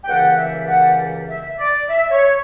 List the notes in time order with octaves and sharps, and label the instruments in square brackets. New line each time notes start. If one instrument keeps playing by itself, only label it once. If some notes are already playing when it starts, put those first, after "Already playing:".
[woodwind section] G5
C#2 C#3 E3 G3 A#3 F#5
E5
F#5
E5
D5
E5
C#5